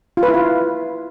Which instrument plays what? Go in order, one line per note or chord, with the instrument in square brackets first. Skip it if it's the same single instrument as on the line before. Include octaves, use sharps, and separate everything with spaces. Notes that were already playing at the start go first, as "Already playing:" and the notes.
[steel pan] F4
B4
E4
F4